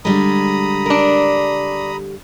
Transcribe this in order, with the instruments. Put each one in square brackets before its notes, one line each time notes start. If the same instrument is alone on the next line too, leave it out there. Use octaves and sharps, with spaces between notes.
[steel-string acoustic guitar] D3 G3 G#3 [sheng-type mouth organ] A#5 B5 D#6
[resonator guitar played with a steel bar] D4 A#4